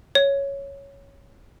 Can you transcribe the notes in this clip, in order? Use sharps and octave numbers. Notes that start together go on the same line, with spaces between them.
C#5